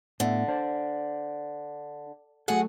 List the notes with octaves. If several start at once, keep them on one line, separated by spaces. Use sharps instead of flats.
A2 D3 B3 E5
D4 C5 D5
F#3 A3 F#4 G#4 A4 F#5